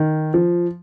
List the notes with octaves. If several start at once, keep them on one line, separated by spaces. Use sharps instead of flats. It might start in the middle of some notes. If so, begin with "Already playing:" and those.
Already playing: D#3
F3